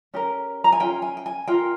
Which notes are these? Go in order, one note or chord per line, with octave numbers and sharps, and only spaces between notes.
C#4 G4 A#4
A#5
G#5
C#4 F4 G5
G#5
G5
G#5
F4 A#4 G5